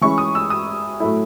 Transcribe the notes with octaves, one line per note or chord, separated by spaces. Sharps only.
E3 G#3 C#4 E4 C#6
D#6
E6
D#6
A2 F#3 A3 E4